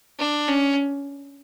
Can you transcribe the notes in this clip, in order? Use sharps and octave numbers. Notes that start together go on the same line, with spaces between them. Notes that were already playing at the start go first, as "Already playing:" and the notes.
D4
C#4